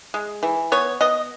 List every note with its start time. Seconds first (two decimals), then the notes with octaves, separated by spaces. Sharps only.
0.14 G#3
0.43 E3
0.72 B3 C#5
1.01 B3 D#5